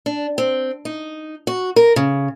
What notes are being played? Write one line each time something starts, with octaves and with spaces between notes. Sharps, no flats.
D4
C4
D#4
F#4
A#4
C#3